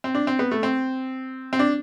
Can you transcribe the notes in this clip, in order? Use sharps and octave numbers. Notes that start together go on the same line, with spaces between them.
C4
D4
C4
B3
A3
C4
C4
D4